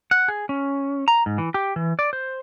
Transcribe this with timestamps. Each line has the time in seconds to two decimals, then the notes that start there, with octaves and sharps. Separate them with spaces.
0.11 F#5
0.28 G#4
0.49 C#4
1.08 A#5
1.26 G#2
1.38 E3
1.54 G4
1.76 E3
1.99 D5
2.13 C5